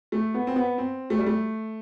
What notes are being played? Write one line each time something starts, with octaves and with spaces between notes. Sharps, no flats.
A3
B3
C4
B3
C4
A3
G3
A3